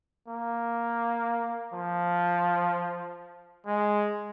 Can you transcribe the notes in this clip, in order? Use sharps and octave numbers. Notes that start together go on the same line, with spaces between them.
A#3
F3
G#3